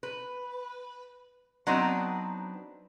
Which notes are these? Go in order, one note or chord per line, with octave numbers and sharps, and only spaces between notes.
B4
F#3 B3 C4 D4 D#4